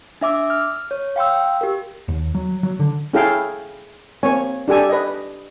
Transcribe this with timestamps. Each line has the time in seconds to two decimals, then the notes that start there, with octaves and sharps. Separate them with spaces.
0.21 D4 E5 D6 E6
0.50 F6
0.91 C#5
1.16 F5 G5 C6 E6
1.61 G4 A#4
2.08 D#2
2.35 F#3
2.63 F#3
2.79 D3
3.13 C#4 E4 G#4 A4 F5 G5
4.23 A#3 C4 C#5 G#5
4.68 D4 G4 A4 G#5
4.89 B4 D#5